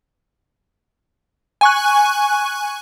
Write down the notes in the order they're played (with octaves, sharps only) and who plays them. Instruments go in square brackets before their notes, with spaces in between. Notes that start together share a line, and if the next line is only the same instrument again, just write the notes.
[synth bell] G#5 C#6 F#6